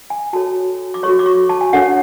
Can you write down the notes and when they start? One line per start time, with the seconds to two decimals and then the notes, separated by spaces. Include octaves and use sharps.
0.10 G#5
0.33 F#4 A4 C#5 A5
0.94 D6
1.03 F#4 A4 C#5 C#6
1.19 D6
1.26 C#6
1.49 A5
1.61 G#5
1.73 D4 A4 C#5 F#5